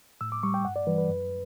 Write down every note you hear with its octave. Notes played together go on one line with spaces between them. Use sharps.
A2 E6
D6
G3 C#6
G5
G2 F#5
D5
E3 G3 B4
B4
F#2